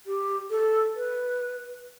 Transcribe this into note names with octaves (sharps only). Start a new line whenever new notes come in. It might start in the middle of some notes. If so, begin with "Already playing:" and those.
G4
A4
B4